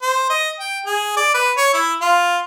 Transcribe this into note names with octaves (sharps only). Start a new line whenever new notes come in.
C5
D#5
G5
G#4
D5
B4
C#5
E4
F4